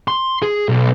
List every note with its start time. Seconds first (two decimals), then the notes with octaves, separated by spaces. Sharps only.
0.08 C6
0.42 G#4
0.69 B1